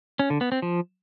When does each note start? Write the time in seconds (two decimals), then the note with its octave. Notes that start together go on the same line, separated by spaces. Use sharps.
0.19 C#4
0.30 D3
0.41 B3
0.52 C4
0.62 F3